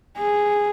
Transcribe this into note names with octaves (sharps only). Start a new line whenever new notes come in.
G#4